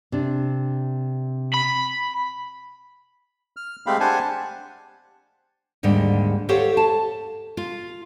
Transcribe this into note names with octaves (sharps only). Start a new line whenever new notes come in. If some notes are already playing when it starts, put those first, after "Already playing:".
C3 D4
B5
F6
G#3 A3 C4 G4 F5 B5
D4 G4 C5 F#5 G#5 A5
D#2 G#2 D3 G3
G4 A4 C5 C#5 F5 F#5
A5
F4